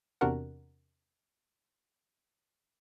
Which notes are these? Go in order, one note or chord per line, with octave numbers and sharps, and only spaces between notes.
E2 C3 D4 F#4 A#4 F#5